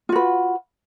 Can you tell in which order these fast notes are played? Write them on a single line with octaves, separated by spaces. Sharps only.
F4 F#4 B4